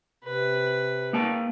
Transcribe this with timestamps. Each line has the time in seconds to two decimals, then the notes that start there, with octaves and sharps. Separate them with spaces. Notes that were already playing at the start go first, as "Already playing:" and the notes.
0.24 C3 B4
1.13 A#3 G5 A5